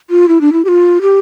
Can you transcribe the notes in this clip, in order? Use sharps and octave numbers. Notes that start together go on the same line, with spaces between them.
F4
E4
D4
E4
G4
F4
G4